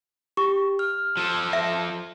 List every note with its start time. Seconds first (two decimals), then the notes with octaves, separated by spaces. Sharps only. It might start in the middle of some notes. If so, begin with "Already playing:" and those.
0.37 G4 C#6
0.79 F6
1.17 F3 A4
1.53 E5